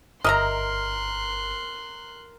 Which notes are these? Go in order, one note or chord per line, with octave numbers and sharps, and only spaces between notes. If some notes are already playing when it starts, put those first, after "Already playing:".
G1 A#4 D#5 E5 A#5 C6 F#6